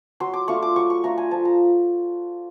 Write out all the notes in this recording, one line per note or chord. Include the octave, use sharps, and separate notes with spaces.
F#3 C6
D6
A3 D4 F4 C#6
D6
F#3 C#6
C#6
A3 D4 F4 A#5
G#5
F3 A5
A#5